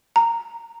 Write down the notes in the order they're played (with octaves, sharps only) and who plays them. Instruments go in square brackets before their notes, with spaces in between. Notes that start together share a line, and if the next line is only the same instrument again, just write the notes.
[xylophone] A#5